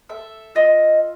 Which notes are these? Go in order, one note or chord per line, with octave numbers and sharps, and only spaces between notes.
A4 E5
F4 D#5